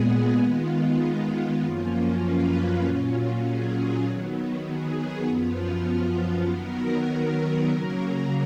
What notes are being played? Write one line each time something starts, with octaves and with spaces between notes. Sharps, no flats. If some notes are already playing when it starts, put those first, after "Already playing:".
Already playing: A#2 G#3 B3 G#4
D#3 G#3 B3 F4
F#2 F3 A#3 C#4 F4
B4
A#2 F#3 C#4 F4
G#4
D#3 F#3 B3
G#4
F#2 F3 B3 F4
D#3 F#3 B3 A#4
C#3 F#3 A#3 A#4